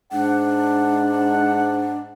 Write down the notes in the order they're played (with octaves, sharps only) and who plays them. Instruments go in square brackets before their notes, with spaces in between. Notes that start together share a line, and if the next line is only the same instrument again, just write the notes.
[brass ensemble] G#2 F#5 [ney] D4